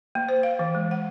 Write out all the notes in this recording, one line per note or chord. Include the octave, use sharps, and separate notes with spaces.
A#3
C5
F5
E3
G#3
F#5